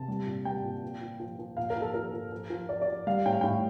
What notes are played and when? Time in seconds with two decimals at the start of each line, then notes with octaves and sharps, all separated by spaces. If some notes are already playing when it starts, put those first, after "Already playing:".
Already playing: C3 A5
0.08 G3
0.26 A#2
0.45 G3 G5
0.64 A#2
0.83 F3
1.01 F3
1.20 F3
1.39 F3
1.57 A#2 F5
1.70 A#4
1.75 F3
1.82 A4
1.94 F3 A#4
2.13 F3
2.32 F3
2.50 F3
2.69 F3 D5
2.81 D5
2.88 F3
3.07 G3 F5
3.26 A2 G5
3.33 F5
3.41 A2 G5